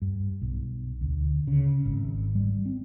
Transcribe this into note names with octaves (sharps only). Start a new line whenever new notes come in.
G2
B1
D2
C#3
G#1
G3
C4